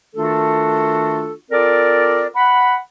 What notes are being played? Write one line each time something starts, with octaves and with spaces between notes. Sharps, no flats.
D#3 A3 D4 F4 F#4 A4
C4 F4 A4 A#4 D5
F#5 B5